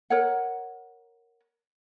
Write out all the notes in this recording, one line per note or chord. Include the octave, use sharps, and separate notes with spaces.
A#4 C#5 F#5